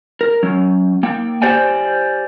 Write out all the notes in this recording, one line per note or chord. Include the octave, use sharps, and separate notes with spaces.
A#4
F#3 C#4
A#3 G5
G4 C5 D5 G5 G#5